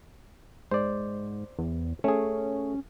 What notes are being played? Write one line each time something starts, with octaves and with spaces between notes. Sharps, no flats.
G#2 C5 D5
E2
A3 C#4 G#4